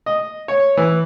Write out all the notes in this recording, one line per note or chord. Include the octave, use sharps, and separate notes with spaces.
D#5
C#5
E3